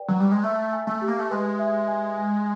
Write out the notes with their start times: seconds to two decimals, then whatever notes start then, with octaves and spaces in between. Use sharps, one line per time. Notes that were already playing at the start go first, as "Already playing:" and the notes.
Already playing: B4 D5 G5
0.08 F#3
0.15 G3 A#5
0.32 G#3
0.43 A3 E5
0.72 G#5
0.87 A3
1.02 G4
1.08 A#3
1.19 A3
1.31 G#3 B4
1.59 E5
1.88 G#5
2.17 G#5